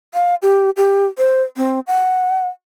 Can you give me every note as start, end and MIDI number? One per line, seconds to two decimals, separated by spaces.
0.14 0.35 77
0.42 0.70 67
0.77 1.06 67
1.18 1.42 72
1.57 1.80 60
1.87 2.48 78